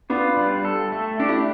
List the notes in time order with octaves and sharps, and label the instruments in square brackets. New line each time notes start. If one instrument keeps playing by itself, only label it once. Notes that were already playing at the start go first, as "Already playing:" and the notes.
[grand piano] B3 D4 [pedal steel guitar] F4
[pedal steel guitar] G3
A4
A3
[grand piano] D4 [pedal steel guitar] G4
[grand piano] E4